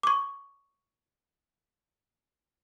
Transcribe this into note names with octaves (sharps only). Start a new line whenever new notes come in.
C#6 D6